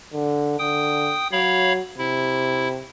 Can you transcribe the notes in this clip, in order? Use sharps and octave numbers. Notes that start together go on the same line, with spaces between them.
D3
D3 G5 D#6
F#3 C#5 F5 B5
C3 E4